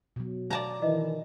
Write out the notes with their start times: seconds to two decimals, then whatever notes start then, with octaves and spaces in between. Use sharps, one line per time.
0.16 B2 F#3
0.50 D5 A5 A#5
0.82 D#3 E3 D#5